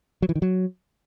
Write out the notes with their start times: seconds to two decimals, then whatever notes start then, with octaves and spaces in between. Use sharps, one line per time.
0.22 F#3
0.29 E3
0.35 D#3
0.42 F#3